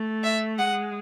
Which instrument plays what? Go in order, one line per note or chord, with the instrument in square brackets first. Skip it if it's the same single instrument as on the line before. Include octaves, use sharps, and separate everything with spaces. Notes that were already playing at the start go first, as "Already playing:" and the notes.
Already playing: [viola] A3
[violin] E5
[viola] G#3 [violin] F#5